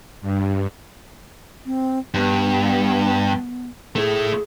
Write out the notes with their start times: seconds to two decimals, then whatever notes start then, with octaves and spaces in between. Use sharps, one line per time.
0.22 G2
1.66 C4
2.14 G2 B3
3.96 A3 E4 G#4